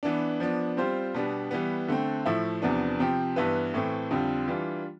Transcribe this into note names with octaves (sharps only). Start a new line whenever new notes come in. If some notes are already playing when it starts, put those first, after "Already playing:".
E3 B3 D4
F3 B3 D4
G3 C4 F4 C5
B2 G3 B3 D4
E3 G3 B3
D3 A3 C4
A2 F3 A3 E4
E2 C3 F3 B3 D4
C3 F3 C4 G4
G2 E3 B3 E4 B4
A2 E3 A3 C4
F2 D3 G3 C4 F4
E3 G3 D4 F4